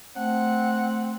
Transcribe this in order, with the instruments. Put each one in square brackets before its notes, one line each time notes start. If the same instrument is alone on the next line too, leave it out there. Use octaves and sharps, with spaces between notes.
[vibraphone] A3 [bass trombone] C4 [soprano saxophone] F#5